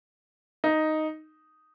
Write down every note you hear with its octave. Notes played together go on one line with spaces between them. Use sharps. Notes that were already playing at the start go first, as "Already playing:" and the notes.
D#4